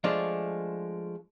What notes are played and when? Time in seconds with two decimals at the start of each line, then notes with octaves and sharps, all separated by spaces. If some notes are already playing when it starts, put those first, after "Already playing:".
0.04 F3 G#3 A3 D4